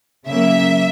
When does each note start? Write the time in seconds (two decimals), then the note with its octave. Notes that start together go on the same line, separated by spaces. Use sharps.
0.28 C#3 F#3 A#3 E5